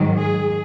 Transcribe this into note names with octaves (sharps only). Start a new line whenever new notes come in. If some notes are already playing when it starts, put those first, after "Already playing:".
Already playing: G#2 D#3 F#3
G#4